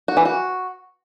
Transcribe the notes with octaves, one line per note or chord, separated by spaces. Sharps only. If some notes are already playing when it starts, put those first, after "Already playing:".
F#4
E3
F#4